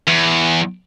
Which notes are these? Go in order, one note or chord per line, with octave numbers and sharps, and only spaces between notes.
E2